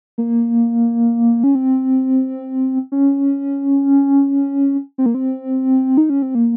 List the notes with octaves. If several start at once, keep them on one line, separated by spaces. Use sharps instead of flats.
A#3
C#4
C4
C#4
C4
A#3
C4
D#4
C#4
C4
A#3